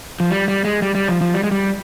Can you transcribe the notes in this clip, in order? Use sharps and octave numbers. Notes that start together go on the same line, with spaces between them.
F3
G3
G3
G#3
G3
G3
F3
F3
G3
G#3
G3